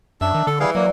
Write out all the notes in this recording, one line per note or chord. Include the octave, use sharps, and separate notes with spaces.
F#2 D4 E5
D#3
D3 A4
E3 G3 G#4 F5
F#3 A#3 D5